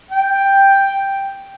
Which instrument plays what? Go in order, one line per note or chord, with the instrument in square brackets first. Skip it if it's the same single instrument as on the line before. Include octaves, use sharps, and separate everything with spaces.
[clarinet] G5